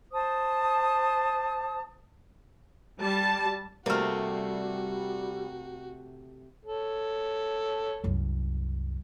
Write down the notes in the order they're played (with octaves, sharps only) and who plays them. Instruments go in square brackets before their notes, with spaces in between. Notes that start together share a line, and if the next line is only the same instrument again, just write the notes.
[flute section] C5 A5 D#6
[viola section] G3 A5
[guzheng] C3 A3 [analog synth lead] G3 [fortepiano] A#3 F6 [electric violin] F#4
[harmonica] A4 C#5
[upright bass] C2 F#2